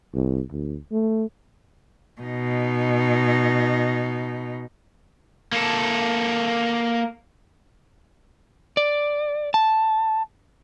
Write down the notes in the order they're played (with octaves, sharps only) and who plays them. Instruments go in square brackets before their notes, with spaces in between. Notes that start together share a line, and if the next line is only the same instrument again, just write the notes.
[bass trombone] C2
D2
A3
[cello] B2 D#4
[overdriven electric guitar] A#3 A4
[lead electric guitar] D5
A5